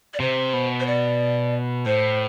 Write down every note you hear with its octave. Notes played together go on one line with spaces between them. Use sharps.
D5
C3 C5
B2
C5
D5
A2 C5